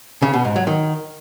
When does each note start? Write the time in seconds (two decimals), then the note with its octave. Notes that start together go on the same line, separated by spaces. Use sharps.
0.22 C#3
0.34 B2
0.45 G#2
0.56 F#3
0.67 D#3